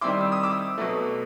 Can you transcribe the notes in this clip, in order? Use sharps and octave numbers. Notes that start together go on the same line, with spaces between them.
D#3 G3 C4 E4 C6 D6
E6
D#6
D6 E6
B2 F#3 A3